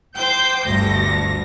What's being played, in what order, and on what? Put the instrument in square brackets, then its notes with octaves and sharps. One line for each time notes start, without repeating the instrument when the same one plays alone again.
[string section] C5 G6 [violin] G5 D6
[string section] G1 D2 G2 [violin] A#6